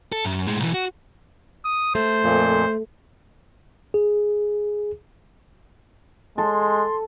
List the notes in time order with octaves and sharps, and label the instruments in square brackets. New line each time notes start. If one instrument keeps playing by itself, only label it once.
[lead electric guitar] A4
F#2
A2 G#3
B1 E3
F#4
[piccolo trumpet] D#6
[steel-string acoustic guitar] A3 [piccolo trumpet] C5
[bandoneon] F2 A#2
[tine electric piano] G#4
[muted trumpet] G#3 [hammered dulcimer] A4 [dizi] C6